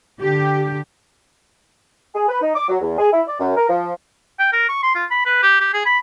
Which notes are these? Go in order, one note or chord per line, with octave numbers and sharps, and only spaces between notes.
D3 G4
G#4
B4
D#4
D6
F#3
E2
G#4
E4
D5
F#2
A#4
F3
G5
A#4
C#6
C6
F4
B5
B4
G4
G4
G#4
B5